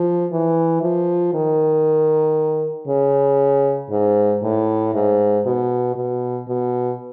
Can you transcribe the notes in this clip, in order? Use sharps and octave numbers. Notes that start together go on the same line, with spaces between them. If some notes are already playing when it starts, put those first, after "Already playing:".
Already playing: F3
E3
F3
D#3
C#3
G#2
A2
G#2
B2
B2
B2